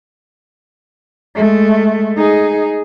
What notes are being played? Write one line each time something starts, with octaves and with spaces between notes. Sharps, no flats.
G#3 A3
D#4 G#4